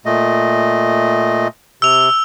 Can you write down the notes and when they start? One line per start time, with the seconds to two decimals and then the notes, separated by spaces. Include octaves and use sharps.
0.05 A#2 A3 D#5
1.82 C3 E6 F7